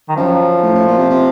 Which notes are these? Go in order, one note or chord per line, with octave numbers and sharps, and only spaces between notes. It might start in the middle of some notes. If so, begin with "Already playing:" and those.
D#3
F#2 F3
A2
A2
A#2
C3
C3